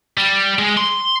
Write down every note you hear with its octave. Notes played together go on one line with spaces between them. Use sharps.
G3
G#3
C6